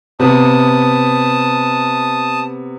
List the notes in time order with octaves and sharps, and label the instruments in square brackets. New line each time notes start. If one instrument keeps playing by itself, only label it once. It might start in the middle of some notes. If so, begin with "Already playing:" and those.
[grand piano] C3 B3 [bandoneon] A5 D#6